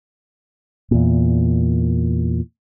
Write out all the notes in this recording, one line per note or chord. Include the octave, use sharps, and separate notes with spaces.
E2 A#2